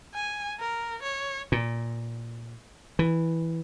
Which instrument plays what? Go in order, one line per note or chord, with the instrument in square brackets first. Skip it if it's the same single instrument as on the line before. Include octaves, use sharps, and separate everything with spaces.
[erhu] G#5
A#4
C#5
[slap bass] A#2
E3